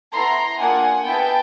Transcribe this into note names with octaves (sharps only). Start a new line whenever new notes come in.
B3 E4 A4 A#5 C6
A#3 D4 F4 G#4 F#5 G#5
B3 E4 G#4 G5 A5